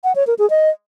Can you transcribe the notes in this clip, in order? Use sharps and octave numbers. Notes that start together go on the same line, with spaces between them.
F#5
C#5
A#4
G#4
D#5